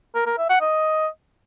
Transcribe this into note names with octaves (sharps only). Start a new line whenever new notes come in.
A#4
A#4
E5
F#5
D#5